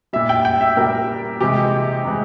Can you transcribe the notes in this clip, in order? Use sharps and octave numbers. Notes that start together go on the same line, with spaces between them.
A#2 G3 E5
G5
G5
E5
A#2 G3 A#4
C3 E3 G#3 G4
C3 E3 G#3